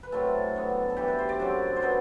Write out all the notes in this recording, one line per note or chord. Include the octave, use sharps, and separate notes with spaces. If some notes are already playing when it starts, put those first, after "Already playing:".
B4
A2 F#3 C4 A4
D3 F#3 B3
A4
G2 E3 G3 G4
B4
C5
D5
F#2 D3 F#3 C4 C5
C5
B2 F#3 B3 B4